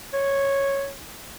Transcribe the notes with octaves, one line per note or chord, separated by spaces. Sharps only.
C#5